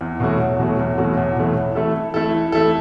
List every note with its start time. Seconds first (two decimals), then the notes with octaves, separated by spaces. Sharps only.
0.01 E2
0.20 B2 F#3 A3 F#4
0.40 E2
0.59 B2 F#3 A3 F#4
0.79 E2
0.97 B2 F#3 A3 F#4
1.17 E2
1.36 B2 F#3 A3 F#4
1.56 E3
1.75 A3 E4 A4
1.94 E3
2.14 A3 E4 A4
2.34 E3
2.52 A3 E4 A4